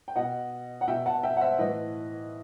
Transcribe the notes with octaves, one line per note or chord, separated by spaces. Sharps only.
G5
B2 D#5 F#5
F#5
B2 E5 G5
F#5 A5
E5 G5
F#5
C5 E5
A2 E3 B4 D#5